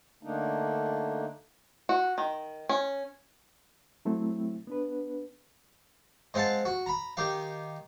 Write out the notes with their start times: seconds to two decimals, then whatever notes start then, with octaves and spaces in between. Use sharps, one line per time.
0.23 D3 A3 A#3 D4 D#4
1.89 F#4
2.18 D#3
2.69 C#4
4.05 F#3 A3 C4 E4
4.67 B3 D4 B4
6.34 G#3 C4 F5 F#5 A5
6.65 F#4
6.86 A#5 B5
7.17 D#3 G4 F5